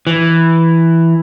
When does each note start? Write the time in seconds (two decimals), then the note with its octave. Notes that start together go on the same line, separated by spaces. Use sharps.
0.07 E3